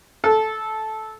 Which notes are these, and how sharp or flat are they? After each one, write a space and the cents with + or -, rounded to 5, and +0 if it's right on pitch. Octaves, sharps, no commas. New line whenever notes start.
A4 -10